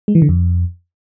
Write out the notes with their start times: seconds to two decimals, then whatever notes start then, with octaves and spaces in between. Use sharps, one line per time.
0.08 G#3
0.15 E3
0.22 D3
0.29 F2